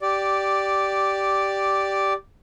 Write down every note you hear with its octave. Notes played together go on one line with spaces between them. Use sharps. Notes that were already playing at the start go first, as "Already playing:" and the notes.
G4 D5